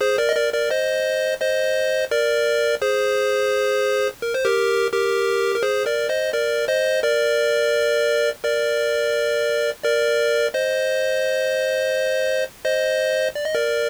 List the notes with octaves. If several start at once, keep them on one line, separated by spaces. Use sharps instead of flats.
G#4 C5
A#4 D5
D#5
A#4 D5
A#4 D5
C5 D#5
C5 D#5
A#4 D5
G#4 C5
A#4
C5
G4 A#4
G4 A#4
A#4
G#4 C5
A#4 D5
C5 D#5
A#4 D5
C5 D#5
A#4 D5
A#4 D5
A#4 D5
C5 D#5
C5 D#5
D5
D#5
A#4 D5